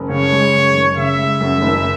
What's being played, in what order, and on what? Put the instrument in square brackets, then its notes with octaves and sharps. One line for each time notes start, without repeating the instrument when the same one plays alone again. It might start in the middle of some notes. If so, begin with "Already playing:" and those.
Already playing: [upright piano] F#1
[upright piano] C#3 [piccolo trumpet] C#5
[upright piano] G#3
F#2
F#1
[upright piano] C#3 [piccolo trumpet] E5
[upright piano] G#3
F#2
F#1